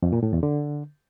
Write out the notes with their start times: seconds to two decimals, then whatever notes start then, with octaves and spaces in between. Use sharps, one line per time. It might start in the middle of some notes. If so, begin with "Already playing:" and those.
0.03 F2
0.13 A#2
0.23 A2
0.33 E2
0.43 D3